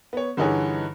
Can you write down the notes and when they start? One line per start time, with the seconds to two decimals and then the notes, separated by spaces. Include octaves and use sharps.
0.13 B3 C#5
0.37 G2 D3 E3 D#4 G#4 C#5